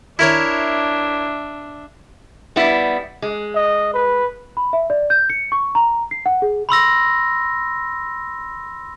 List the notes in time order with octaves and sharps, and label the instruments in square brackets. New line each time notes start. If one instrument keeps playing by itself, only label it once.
[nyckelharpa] D4 E5 [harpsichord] E4 A#4 C#5
[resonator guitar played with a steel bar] G3 B3 E4
G#3
[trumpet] D#5
B4
[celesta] B5
E5
D5
G6
C#7
C#6
A#5
C7
F#5
G#4
[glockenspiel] B5 C6 E6 A#6